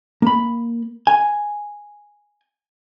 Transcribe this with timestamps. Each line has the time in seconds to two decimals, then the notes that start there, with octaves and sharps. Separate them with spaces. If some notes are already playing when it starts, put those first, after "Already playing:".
0.22 A#3 B5
1.07 G#5